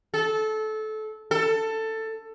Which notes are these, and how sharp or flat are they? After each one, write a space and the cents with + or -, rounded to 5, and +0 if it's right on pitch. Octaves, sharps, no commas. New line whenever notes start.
A4 -20
A4 +15